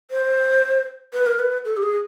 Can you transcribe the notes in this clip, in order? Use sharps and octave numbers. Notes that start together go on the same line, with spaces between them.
C5
B4
A#4
B4
A4
G4
G#4